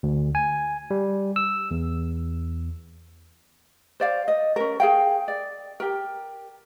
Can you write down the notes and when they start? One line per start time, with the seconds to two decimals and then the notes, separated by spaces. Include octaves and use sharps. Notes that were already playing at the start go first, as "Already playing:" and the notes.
0.03 D2
0.35 G#5
0.91 G3
1.36 E6
1.71 E2
4.00 C5 D5 F5
4.28 D#5
4.56 C#4 A#4
4.80 G#4 F5 G5
5.28 D5
5.80 G4 A#4